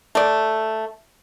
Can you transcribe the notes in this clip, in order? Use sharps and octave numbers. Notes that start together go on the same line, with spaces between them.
A3 D5